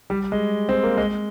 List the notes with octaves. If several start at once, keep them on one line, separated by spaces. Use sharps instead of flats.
G3
G#3
C4
A#3
G#3